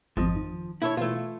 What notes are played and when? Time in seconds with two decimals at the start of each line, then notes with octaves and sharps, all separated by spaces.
0.17 G#1 F2 F3 D#5
0.36 D#3
0.82 E4 A4 C#5
0.97 B2 E3 A3 F4